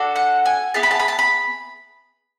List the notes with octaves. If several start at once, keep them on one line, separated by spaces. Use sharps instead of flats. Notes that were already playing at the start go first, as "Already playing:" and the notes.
Already playing: D4 F#4 A4
F#5
G#5
B3 E4 G#4 A5
B5
A5
B5
A5
B5